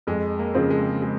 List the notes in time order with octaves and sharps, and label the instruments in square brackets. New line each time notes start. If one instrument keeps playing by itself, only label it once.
[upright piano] F2 [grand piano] G#3
[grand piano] A#3
[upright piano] C#3 F3 C4
[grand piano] G#3
G#3